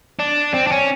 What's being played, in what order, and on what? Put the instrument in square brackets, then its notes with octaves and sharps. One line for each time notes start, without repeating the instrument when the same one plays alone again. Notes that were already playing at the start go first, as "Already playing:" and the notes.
[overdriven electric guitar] D4
C4
D4
C#4